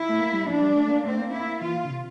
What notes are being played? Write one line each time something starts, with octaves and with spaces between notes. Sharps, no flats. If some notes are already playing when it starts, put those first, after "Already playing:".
Already playing: E4
A3
A#3
G3
F3 D4
G3
A3
A3
A#3
A3 C4
A#3
E4
E3 F4
D3
C3